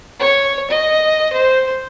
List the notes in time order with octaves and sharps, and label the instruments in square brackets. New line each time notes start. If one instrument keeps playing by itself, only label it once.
[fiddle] C#5
D#5
C5